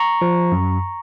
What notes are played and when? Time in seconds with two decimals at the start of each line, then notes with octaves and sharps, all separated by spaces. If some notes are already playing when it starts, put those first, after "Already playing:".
Already playing: A#5 C#6
0.22 F3
0.52 F#2